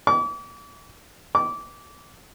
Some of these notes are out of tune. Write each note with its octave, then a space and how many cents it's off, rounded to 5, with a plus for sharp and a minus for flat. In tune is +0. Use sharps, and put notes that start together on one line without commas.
D6 -40
D6 -20